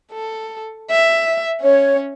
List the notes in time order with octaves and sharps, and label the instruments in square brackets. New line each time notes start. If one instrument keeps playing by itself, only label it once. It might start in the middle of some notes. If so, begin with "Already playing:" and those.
[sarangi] A4
E5
[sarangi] C#4 [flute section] C#5